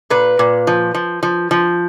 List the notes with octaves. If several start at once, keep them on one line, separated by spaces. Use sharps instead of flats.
A#2 B4
A#2
F3
F3
F3
F3